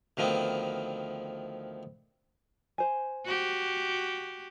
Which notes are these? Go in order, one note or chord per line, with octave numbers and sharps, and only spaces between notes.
D2 D#3 F3 B3 C4
C5 G#5
F#4 G4